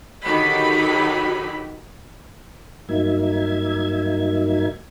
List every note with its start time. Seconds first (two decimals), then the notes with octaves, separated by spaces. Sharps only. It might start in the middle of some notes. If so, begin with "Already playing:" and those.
0.23 D3 D#3 F#3 D#4 G4 B5
2.89 G2 F#3 A#3 D#4 E5 G#6